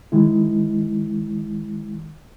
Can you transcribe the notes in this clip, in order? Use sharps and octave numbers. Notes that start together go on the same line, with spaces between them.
D#3 G#3 E4